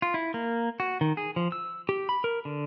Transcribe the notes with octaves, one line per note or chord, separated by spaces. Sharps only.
F4
E4
A#3
F#4
D#3
G#4
F3
E6
G4
B5
A#4
D3